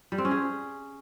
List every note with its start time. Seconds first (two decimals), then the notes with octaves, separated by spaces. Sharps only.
0.12 G3
0.18 C4
0.25 C#4
0.31 G#4